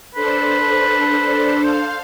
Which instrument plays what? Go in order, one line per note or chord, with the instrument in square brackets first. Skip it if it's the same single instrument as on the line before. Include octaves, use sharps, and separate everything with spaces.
[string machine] D4 A4 C5 [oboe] B4
[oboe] C5 [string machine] F5